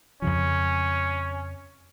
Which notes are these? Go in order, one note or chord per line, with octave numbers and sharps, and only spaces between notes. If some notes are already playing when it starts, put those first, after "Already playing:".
F2 C#3 F3 C#4